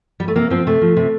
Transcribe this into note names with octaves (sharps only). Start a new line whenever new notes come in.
G3
A3
C3 A#3
F3 C4
C3 A3
F3
C3